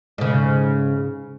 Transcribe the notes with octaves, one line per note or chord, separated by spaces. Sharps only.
G#2 C#3